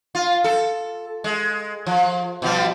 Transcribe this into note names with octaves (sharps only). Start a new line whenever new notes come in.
F4
A4
G#3
F3
B2 F3 G3